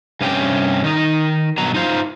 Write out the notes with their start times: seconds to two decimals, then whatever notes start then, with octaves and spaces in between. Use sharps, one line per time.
0.21 G2 C3 C#4 G4 G#4 G5
0.84 D#3 D#4
1.58 G2 B2 F#3 A#5
1.74 D#4 F4 C5 F5